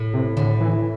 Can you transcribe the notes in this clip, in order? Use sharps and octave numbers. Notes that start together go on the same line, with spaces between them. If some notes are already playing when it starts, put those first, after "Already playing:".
Already playing: A2
C3
A2 D3
E3